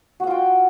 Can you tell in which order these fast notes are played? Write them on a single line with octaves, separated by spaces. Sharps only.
F#4 F#5 F4 G5